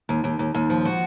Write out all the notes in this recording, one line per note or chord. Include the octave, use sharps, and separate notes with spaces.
D#2
D#2
D#2
D#2
F3
F#4